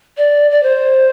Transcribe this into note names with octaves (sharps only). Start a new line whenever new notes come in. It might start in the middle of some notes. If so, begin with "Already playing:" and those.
D5
D5
C5